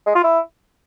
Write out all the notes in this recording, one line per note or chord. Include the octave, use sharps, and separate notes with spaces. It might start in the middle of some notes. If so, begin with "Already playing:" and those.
G#3
F4
E4